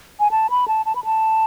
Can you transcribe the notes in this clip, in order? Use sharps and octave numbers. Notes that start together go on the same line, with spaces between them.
G#5
A5
B5
A5
A5
B5
A5